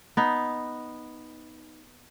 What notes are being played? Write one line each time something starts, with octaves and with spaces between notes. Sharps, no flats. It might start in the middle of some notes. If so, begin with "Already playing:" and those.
B3 D#4